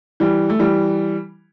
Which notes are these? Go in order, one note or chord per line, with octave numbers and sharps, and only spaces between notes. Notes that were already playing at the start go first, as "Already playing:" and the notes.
E3 G3
A3
E3 G3